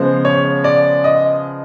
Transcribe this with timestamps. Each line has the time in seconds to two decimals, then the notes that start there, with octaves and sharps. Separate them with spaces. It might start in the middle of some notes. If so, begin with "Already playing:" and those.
Already playing: C#3 F3 G#3 B3 C5
0.25 C#5
0.64 D5
1.04 D#5